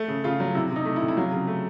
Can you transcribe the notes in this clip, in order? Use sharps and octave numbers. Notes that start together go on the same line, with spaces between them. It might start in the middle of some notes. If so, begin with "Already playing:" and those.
Already playing: A3
C#3
C#3 F4
F#3
C3 E4
C3
D#4
A3
E4
C3
E4
F#3 F4
C#3
A3